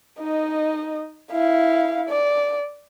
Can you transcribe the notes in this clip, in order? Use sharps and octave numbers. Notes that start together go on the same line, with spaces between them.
D#4 D#5
E4 F5
D5